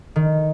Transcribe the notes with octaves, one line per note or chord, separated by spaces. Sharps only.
D#3